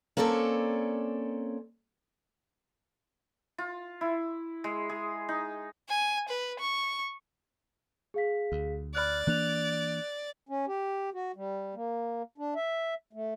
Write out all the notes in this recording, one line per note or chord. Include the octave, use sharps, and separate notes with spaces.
A#3 C4 C#4 A4 D5
F4
E4
G#3
G#4
D#4
G#5
B4
C#6
G#4 F5 B6
D2
D5 B5 F6 F#6
E3 A#3 D4 F#6 F7
C#4
G4
F#4
G3
A#3
D4
E5
A3